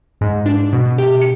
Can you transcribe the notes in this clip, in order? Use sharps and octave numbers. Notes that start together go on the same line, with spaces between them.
G#2
D4
B2
G4
C#7